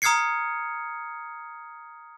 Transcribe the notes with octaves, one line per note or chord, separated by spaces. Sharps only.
A#5 D#6 F6 G#6 C7 C#7